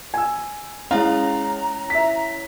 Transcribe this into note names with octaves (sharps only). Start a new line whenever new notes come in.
G#5 E6
G#3 C#4 E4 C#5 F5 A#5
E5 B6